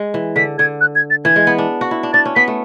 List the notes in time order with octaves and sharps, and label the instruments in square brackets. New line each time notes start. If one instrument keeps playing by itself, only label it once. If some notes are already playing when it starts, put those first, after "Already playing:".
Already playing: [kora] G#3
E3
[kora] D3 [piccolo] B6
[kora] D3 [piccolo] G#6
[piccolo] F#6
G#6
A6
[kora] E3 [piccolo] G#6
[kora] G#3
B3
D4
F#4
E4
D4
[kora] D4 [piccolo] A6
[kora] C#4
[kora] B3 [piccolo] B6
[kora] A3